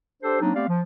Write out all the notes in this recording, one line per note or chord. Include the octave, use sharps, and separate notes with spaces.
D4 G4 A4 C5
F#3 A#3 C4 D4 D#4
A3 B3 C4 G4 D5 F5
F3